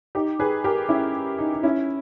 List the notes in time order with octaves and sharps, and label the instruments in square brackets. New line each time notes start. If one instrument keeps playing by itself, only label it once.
[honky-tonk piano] D#4 G4
G#4 B4
G4 A#4
C#4 E4
D#4
D#4
C#4 E4